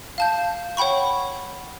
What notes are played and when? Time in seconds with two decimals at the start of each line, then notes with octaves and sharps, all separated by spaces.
0.18 F5 A5 G6
0.77 C#5 F#5 G5 B5 C#6